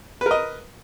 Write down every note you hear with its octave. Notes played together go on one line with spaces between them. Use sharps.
A#4 B4 D#5